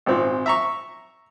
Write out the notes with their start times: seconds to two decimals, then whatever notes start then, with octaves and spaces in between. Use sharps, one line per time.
0.06 G#1 A#2 C4
0.46 E5 A#5 C#6